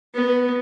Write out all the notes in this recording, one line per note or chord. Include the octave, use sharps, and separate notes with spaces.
B3